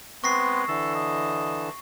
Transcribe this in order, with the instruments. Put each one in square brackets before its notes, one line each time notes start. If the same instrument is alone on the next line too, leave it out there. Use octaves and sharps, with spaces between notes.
[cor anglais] G#3 [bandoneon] B3 C4 B4 [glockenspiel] C#6 A#6 C7
[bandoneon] D3 E3 A5 [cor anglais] A4
[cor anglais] D#5